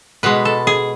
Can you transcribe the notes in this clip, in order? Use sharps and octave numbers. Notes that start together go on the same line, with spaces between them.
B2 G#3 B4
A4
G#4